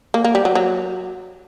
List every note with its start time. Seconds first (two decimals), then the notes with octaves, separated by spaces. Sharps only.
0.14 A#3
0.24 A#3
0.35 G3
0.45 F#3
0.55 F#3